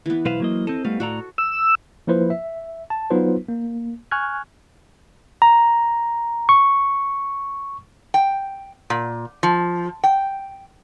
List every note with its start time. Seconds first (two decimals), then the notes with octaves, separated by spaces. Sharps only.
0.06 E3 B3
0.25 B1 B4 C5 F5
0.40 F#3 A#3 D#5
0.67 C4 A4 D#5
0.85 G3 A3 B3 F5
1.00 A2 F#4 A4 D5 A#5
1.38 E6
2.07 F3 A#3 E4 B4 C5
2.30 E5
2.90 A5
3.10 F#3 B3 D#4 F4 B4 C5
3.49 A#3
4.11 G#5 C#6 F6 F#6 G#6
5.42 A#5
6.49 C#6
8.14 G5
8.90 A#2
9.43 F3
10.04 G5